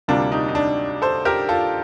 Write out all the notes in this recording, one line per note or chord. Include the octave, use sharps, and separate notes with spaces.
D2 C3 G3 A#3 D4 F4
D#4 G4
D#4
D4
A4 C5
G4 A#4
F4 A4